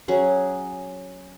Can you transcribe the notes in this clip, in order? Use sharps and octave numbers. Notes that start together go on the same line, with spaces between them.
F#3 C#4 G#4